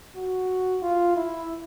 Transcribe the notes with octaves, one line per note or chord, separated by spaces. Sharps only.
F#4
F4
E4